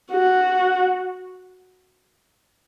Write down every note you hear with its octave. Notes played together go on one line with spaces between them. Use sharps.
F#4